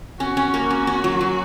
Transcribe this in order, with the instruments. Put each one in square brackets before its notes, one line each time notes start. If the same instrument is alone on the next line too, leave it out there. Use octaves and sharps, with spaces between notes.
[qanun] C#4 [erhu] F#4
[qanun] C#4
A#3
C#4
C#4
F#3
F#3